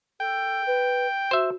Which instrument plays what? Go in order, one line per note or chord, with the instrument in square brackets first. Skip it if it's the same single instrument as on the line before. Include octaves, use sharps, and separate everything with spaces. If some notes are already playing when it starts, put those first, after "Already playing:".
[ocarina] A4 [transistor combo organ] G5
[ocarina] B4
[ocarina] F#4 [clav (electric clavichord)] C5 E5